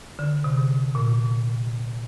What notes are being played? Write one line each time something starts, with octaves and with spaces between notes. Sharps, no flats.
D3
C3
A#2